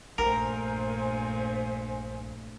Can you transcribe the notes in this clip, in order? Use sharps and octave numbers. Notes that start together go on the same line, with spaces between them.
A#1 G2 A#2 A3 A#4 C5 G#5